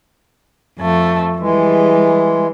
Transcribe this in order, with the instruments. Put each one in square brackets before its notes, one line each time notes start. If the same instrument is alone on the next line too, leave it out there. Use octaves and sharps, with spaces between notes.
[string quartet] F2 A3
[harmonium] E3 G#3 [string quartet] G3